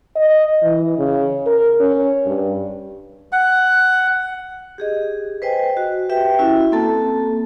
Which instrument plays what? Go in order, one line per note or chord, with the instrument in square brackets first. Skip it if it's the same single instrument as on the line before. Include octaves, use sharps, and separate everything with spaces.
[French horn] D#5
E3
C#3
A#4
C#4
G2
[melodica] F#5
[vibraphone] G4 G#4 D#5
B4 C5 D#5 G5 G#5
F#4
G4 B4 E5 G5
C#4 E4 F#4 E5
A#3 C4 A4 A5